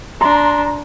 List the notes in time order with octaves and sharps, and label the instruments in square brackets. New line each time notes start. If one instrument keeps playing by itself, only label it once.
[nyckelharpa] D4 [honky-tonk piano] A#5 C6